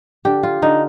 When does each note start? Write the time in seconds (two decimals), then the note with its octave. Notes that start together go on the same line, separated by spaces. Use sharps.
0.25 D3 G4
0.43 F4
0.62 D3 D#4